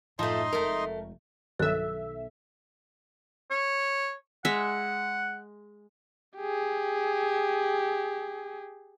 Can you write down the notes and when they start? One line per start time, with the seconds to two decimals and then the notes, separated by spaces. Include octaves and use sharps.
0.19 F#2 A2 F3 A3 D#4 D#5 C6
0.53 F1 G#3 A3 A#4
1.59 B1 G2 D#3 A4 E5 F#6
3.51 C#5
4.45 G#3 E5 F#5
6.38 G4 G#4